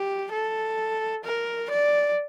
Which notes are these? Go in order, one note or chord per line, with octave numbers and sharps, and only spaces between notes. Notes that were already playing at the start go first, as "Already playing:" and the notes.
Already playing: G4
A4
A#4
D5